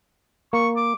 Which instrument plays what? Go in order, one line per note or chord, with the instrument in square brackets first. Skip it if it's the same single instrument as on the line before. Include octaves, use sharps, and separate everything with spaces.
[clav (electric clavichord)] A#3 [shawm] C#6
[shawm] D6